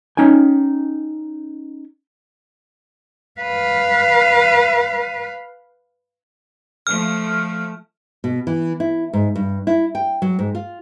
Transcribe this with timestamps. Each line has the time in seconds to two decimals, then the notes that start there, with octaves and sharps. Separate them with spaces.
0.17 C#4 D#4 G5 G#5
3.41 B4 F5
6.87 F3 A3 F6
8.24 B2
8.47 E3
8.80 E4
9.13 G#2
9.36 G2
9.67 E4
9.95 G5
10.22 F#3
10.39 G#2
10.55 F4